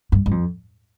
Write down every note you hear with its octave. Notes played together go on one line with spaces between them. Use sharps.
G2
G2
F2